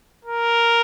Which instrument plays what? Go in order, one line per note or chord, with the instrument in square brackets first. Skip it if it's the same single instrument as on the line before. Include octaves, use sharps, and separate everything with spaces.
[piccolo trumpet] A#4